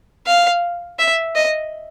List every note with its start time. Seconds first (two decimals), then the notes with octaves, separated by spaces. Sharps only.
0.27 F5
0.99 E5
1.36 D#5